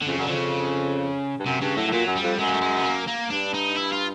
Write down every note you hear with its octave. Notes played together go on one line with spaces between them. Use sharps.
D3
F2 C#3
F#2 D3
F2 C#3
G2
F#2 C3
G2 C#3
A2 F#3
A2
A#2 F#3
F#2
G3
F2
F#2 G#3
A#3
A3
G#3
B3
A#3
A#3
G2 D4
D#4
E4
F4